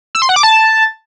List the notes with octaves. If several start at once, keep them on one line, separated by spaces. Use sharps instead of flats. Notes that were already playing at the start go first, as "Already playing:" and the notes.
E6
C6
F#5
D6
A5